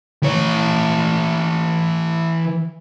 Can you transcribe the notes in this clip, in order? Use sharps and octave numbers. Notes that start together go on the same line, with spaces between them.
E3 C#5